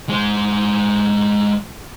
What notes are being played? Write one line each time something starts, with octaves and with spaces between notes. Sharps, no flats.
G#3 C5